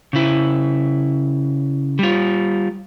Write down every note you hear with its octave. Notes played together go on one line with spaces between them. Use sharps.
C#3 E4
G3 F4